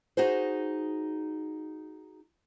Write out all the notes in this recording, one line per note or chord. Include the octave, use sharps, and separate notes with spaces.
D#4 F#4 G#4 C5